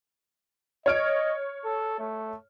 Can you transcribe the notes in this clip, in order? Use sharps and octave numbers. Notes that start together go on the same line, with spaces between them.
C#5 D#5 F6 D7
A4
A3